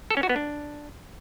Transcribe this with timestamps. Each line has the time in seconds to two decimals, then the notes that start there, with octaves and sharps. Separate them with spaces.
0.10 A4
0.17 C#4
0.23 F#4
0.29 B3
0.36 D4